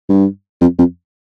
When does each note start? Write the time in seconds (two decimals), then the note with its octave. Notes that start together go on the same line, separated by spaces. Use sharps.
0.09 G2
0.61 F2
0.78 F2